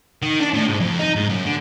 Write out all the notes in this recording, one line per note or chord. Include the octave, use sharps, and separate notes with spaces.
D#3
D4
A2
G#2
F2
D#4
G#2
F#2
D3